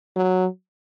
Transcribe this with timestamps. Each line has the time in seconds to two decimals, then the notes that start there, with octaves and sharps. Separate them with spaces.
0.16 F#3